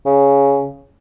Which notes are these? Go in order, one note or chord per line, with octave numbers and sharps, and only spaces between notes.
C#3